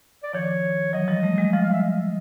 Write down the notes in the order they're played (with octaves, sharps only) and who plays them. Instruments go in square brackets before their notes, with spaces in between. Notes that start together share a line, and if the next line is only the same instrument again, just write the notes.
[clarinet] D5
[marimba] D#3 F3 [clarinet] C#5
[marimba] E3 F#3 [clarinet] D#5
[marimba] F3 G3
G3 A3
F#3 G#3
[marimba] F3 G3 [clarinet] F5
[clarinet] F5
E5
D#5